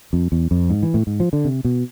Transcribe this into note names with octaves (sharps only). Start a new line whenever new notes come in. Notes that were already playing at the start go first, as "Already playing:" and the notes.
F2
E2
F2
G#2
E3
A2
G#2
F3
D3
C3
B2